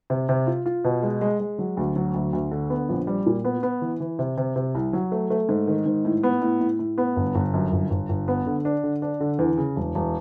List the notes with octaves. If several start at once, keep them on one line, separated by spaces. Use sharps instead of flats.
C3
C3
F4
F4
B2
G#3
G#3
G#3
F#3
D2
F#3
D2
D2
D3
B3
A#1
G3
A#2
B3
B3
E3
E3
C3
C3
C3
C2
F#3
A3
A3
G#2
D#3
G#2
A2
B3
A2
A2
A2
B3
G1
G1
F#2
G1
G1
G1
B3
D3
D4
D3
D4
D3
E2
C#3
E1
E1